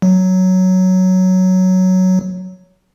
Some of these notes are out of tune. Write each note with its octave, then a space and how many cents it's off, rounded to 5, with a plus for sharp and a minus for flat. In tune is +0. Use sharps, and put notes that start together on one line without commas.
F#3 +5